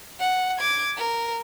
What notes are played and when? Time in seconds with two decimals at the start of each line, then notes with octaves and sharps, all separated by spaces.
0.20 F#5
0.59 D6 G#6
0.97 A#4